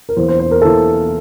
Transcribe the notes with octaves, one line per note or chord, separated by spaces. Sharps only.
A#4
E2 E3 A#3 C5
C5
C5
A#4
E3 A#3 A4